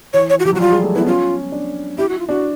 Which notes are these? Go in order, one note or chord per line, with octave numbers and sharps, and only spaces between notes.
E3 C#5
C#5
F#4
F3 G4
F#3
F#4
G3 F4
G#3
A3
B3 E4
C#4 F4
D4
E4 G4
F#4
F4
D4 F#4